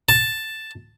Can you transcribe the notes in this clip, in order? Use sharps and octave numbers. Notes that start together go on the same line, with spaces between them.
A5